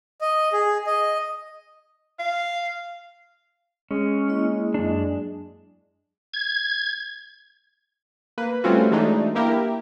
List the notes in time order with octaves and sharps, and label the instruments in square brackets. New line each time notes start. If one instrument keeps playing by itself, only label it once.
[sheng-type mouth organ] D#5
G#4
D#5
[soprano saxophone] F5
[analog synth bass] G#3 [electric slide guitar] C#4
[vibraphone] A#3 E4 D#5
[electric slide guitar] F#2 D4
[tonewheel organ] G#6
[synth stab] A#3 B4
G3 A3 C4 C#4 F4 F#4
E3 F#3 G#3 A3 D4 D#4
A#3 E4 G4 A#4